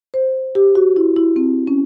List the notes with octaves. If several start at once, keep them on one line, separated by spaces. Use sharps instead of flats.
C5
G4
F#4
E4
E4
C4
C#4